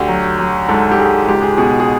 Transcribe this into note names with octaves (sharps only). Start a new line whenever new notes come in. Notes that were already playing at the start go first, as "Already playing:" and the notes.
Already playing: D2 G4
F#3
F#3
G#2 A4
G4
G#2 G#4
C#2 G4
G#4
B2 G#4
G#4